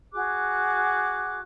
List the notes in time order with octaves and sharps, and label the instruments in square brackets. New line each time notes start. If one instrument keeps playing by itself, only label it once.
[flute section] F#4 G#4 D6 F#6